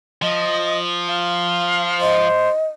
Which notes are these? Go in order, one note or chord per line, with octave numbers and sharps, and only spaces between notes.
F3 D#5
F5
C5 D#5